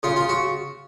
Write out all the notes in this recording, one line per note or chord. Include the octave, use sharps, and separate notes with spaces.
C#3 F4
F4
F#4